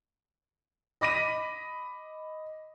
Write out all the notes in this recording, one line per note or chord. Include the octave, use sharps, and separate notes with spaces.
D#5 B5 D6 A#6 B6 D#7